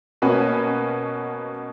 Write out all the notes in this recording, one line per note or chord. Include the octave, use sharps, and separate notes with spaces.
B2 A#3 C#4 F#4 B4